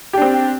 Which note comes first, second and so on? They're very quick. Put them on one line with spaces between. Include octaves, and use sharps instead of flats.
G4 D4 C4